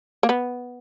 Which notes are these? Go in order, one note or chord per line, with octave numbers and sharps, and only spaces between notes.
A#3
B3